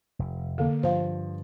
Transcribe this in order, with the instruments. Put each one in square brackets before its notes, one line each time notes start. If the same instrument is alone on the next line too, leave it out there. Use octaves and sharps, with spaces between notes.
[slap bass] F1
[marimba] D3 [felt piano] A#3 A4 F5
[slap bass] G2 [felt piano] F3 [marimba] C5 F5